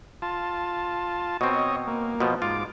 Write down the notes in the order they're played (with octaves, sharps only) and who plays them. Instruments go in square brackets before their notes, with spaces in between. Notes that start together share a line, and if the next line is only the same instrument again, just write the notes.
[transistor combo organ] F4 A5
[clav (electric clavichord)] B2 C4 [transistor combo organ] C#5 D#5
[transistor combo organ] A#3
[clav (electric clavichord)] B2 F3
[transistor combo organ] G#2 D6 [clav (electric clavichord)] F4